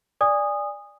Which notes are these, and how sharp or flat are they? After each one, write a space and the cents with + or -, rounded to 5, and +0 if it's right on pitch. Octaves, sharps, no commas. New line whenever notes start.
D5 +0 G#5 -25 D#6 -10